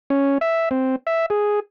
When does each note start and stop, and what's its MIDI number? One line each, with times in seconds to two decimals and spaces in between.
0.10 0.38 61
0.41 0.69 76
0.71 0.96 60
1.07 1.26 76
1.30 1.60 68